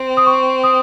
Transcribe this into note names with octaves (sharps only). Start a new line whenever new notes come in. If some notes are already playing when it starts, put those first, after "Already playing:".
Already playing: C4
D#6
C#6
D#6